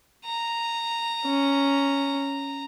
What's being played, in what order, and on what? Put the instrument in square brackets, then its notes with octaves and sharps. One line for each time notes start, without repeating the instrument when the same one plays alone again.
[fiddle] A#5
[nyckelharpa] C#4